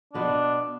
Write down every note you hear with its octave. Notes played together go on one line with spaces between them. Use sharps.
B2 B3 D4 F4 B4